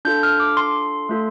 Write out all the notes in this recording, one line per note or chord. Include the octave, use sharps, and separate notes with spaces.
D4 F4 A4 G6
F6
D6
C6
A3 F4 A4